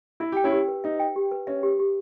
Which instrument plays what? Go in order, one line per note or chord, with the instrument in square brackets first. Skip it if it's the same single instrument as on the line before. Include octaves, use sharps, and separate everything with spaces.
[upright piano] E4 [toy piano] E5
[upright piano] G4 [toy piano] G5
[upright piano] C#4 E4
[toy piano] G4
B4
[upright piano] D#4 [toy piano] E5
[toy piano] G5
G4
B4
[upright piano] C#4 [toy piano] E5
[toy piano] G4
G4